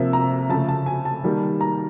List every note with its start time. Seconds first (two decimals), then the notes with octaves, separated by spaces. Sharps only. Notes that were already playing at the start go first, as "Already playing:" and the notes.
Already playing: C3 F3 A#3 E5
0.13 A#5
0.49 C#3 F3 A3 A5
0.68 A5
0.86 G#5
1.05 A5
1.24 D#3 G3 A#3
1.61 A#5